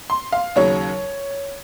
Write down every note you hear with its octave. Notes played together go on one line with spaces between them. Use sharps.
C6
F5
D#2 C#3 F#3 C#5